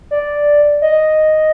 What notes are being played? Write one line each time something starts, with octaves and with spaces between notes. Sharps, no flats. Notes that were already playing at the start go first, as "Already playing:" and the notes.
D5
D#5